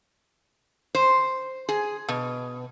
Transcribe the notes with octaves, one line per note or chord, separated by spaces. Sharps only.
C5
G#4
B2